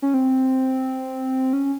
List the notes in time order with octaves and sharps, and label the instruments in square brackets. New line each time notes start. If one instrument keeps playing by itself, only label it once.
[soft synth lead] C#4
C4
C#4